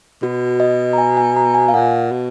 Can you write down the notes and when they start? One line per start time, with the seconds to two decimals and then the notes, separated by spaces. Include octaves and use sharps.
0.22 B2 F#4
0.60 D#5
0.93 A#5
0.98 G#5
1.17 G#5
1.36 A#5
1.54 G#5
1.68 F5
1.74 A#2 F#5
2.12 B2